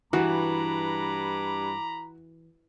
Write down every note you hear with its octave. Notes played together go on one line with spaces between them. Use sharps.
G2 E3 F#4 A#5 B5 D6